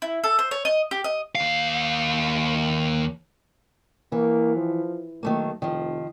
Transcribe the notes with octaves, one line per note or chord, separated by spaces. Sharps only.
E4
A4
C5
C#5
D#5
G4
D#5
D#2 F5
E3 A#3
F3
B1 D#3 A3 A#3
F1 D#3 F3